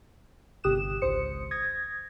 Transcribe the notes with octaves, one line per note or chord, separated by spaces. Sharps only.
G1 C3 G4 D#6 F#6 E7
G#1 C#2 C5 D#6 C#7
D#6 G#6 A#6